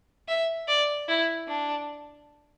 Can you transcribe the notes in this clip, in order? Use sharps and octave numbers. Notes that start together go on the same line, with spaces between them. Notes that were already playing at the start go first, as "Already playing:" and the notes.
E5
D5
E4
D4